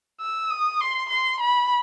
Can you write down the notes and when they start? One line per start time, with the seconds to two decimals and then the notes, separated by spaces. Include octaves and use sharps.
0.21 E6
0.51 D#6
0.81 C6
1.09 C6
1.40 B5